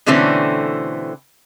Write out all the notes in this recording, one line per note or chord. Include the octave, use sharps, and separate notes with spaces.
B2 D3 E3 A3 C4 C#4